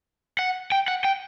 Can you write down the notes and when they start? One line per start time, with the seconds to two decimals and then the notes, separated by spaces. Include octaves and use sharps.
0.39 F#5
0.72 G5
0.88 F#5
1.05 G5